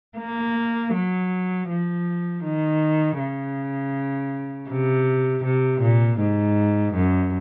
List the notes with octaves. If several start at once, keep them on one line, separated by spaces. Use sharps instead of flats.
A#3
F#3
F3
D#3
C#3
C3
C3
A#2
G#2
F#2